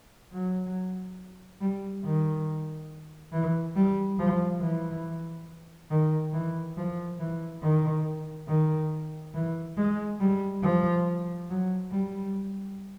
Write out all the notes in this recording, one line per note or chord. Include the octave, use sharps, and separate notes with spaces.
F#3
G3
D#3
E3
G3
F3
E3
D#3
E3
F3
E3
D#3
D#3
E3
G#3
G3
F3
F#3
G3